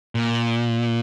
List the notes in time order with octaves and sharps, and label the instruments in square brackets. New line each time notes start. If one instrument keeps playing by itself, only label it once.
[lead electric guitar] A#2